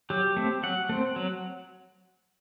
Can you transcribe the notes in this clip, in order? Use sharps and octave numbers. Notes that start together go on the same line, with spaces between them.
F#3 G4
A3 C4
F#3 F#5
A3 C4
F#3